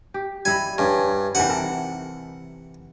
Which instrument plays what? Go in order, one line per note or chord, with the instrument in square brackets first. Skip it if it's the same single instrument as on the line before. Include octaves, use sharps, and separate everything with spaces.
[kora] G4
[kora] G3 E4 D#5 [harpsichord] G#5
[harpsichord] G2 [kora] C#4
[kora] C3 D#3 E3 [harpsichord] F#5
[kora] A4 A#4